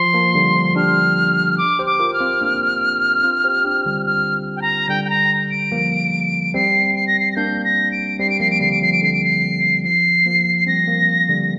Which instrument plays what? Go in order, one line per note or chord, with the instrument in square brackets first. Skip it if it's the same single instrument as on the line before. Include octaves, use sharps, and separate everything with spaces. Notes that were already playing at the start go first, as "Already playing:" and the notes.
Already playing: [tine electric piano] F3 [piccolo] C6
[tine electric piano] F3 A#3
D3 G3
F3
[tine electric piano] D4 G4 [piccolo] F6
[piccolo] D6
[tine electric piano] G4 C5
[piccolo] D6
[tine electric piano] F4 A#4
[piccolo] F6
[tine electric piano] C4 F4
A#3 D4
C4 F4
G4 C5
D4 G4
D3 G3
[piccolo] F6
G5
A#5
[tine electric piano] D3 G3 [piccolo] G5
[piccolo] G5
A#5
D7
[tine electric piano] F3 A#3
[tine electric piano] G3 C4 [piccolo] C7
[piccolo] C7
A#6
C7
A#6
[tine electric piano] A#3 D4 [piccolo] G6
[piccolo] A#6
D7
[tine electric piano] G3 C4 [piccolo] C7
[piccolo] D7
[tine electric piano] F3 A#3 [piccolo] C7
[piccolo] D7
[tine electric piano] D3 G3 [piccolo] C7
[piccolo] D7
[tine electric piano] F3 [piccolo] C7
[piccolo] D7
[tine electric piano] D3 [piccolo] C7
[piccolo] D7
C7
[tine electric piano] F3 [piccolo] C7
[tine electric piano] F3 A#3
[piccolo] C7
[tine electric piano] G3 C4 [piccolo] A#6
[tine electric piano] F3 A#3
D3 G3